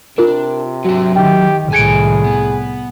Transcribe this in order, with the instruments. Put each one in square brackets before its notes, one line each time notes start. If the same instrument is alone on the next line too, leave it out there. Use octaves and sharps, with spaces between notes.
[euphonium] C3 [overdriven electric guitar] D4 [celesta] F4 A#4
[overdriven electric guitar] F#3 E5 [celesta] F#4
[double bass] D#3 [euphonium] G4 [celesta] G5
[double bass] C2 A2 [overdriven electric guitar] D#3 G#5 [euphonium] G#4 [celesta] G#6 C#7 D7
[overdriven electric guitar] B3